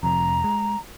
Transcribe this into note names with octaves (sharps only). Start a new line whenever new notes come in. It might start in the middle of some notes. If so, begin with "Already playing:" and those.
F1 F2 A#5
G#3